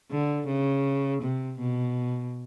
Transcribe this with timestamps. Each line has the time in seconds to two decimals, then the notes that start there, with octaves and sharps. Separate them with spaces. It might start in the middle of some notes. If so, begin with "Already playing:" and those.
0.11 D3
0.47 C#3
1.22 C3
1.59 B2